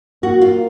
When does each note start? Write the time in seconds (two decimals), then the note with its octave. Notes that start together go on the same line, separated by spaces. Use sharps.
0.23 A#3 F#4
0.42 F4